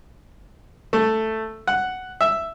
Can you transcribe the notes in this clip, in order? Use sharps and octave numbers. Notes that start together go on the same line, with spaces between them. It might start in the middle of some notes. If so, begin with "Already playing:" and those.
A3
F#5
E5